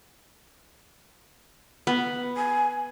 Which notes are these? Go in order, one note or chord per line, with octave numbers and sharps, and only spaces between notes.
B3
G#5